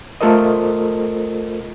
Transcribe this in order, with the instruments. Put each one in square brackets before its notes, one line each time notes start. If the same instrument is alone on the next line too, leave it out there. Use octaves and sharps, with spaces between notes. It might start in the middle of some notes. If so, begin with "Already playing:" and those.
[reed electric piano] A3 F4 A4 A#4 C5 D#5